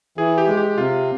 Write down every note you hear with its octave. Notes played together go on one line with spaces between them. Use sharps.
E3 G#4
G4
G#3
G4
C3 F4